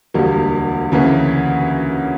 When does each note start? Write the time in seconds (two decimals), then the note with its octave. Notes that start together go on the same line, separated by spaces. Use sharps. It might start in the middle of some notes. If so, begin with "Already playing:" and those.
0.14 E1 D2 D3 G3 A#3
0.92 D2 C#3 E3 A#3